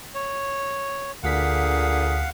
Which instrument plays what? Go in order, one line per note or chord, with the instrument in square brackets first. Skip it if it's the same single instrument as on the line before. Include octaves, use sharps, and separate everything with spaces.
[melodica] C#5
[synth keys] D2 B6 [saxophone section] A#2 D3 G#4 [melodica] F5 F#5